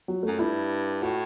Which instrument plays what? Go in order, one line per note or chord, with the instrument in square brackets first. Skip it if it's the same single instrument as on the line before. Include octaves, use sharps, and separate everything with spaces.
[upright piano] F#3
[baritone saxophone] F#2 [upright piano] A3
[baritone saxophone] G2 [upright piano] E4
[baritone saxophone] A2 [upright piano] F#4